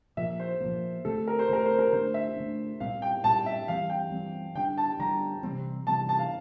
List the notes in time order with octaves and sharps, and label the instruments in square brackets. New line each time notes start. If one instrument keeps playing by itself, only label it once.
[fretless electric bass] A#2 F3 A#3 [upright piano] E5
[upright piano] C5
[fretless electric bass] A#2 F3 A#3
[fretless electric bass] D3 A3 C4 [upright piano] A4
[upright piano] A#4
C5
[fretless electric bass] D3 A3 C4 [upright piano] A#4
[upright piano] C5
A#4
[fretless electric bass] D3 A3 D4 [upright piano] C5
[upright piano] E5
[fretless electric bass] D3 A3 D4
[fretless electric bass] A#2 G3 C4 [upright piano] F5
[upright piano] G5
[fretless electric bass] A#2 G3 C4 [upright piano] A5
[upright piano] E5
[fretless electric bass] E3 G3 C4 [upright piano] F5
[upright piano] G5
[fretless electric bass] E3 G3 C4
[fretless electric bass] D3 G3 D4 [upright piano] G5
[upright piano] A5
[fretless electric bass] D3 G3 D4 [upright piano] A#5
[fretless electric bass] C3 E3 G3 C4
[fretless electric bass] C3 E3 G3 C4 [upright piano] A5
[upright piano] A5
F5